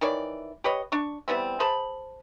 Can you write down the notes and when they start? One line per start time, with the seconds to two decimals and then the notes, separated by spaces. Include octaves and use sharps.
0.01 D#3 E3 C#5 D5
0.64 G4 B4 C#5 D#5
0.92 D4 C#6
1.28 E3 G3 B3 C4
1.60 G#4 C5 A5 B5